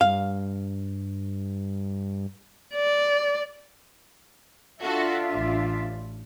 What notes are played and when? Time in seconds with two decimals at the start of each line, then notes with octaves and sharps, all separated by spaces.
0.01 G2 F5
2.75 D5
4.81 D4 F4 F#4 A4 E5
5.31 A1